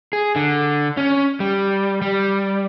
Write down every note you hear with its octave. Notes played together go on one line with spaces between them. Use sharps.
G#4
D3
C#4
G3
G3